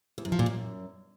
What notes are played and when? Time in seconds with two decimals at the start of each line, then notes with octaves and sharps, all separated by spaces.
0.18 E2
0.25 F#2
0.32 F3
0.39 A#2
0.46 F#2